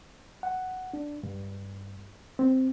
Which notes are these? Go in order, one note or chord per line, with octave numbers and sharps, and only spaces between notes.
F#5
D4
G2
C4